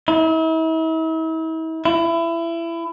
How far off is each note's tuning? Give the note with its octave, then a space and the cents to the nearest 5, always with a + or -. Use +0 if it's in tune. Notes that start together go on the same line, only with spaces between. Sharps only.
E4 -40
E4 +25